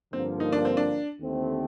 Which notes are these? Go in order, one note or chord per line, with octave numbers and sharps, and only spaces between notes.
G2 D3 F3 A#3 C4
D#4
D4
C4
D4
D#2 D3 A3 C4 G4